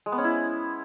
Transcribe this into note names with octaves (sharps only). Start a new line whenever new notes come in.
G#3
B3
C#4
E4